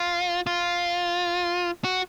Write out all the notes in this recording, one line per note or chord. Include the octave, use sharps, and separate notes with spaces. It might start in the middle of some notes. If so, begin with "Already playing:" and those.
Already playing: F4
F4
F#4